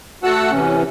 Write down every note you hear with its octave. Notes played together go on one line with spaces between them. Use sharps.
A3 F#4 F#5 A5 E6 F#6
C3 E3 C#4